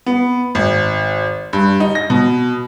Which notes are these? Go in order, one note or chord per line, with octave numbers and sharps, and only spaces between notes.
B3
G#1
G2
D#4
A#6
B2